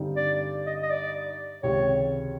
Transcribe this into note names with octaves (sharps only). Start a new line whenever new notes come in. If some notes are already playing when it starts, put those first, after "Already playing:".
Already playing: G2 D3 G3 C4 D#4
D5
D#5
D#5
D5
C#2 C3 D#3 C#5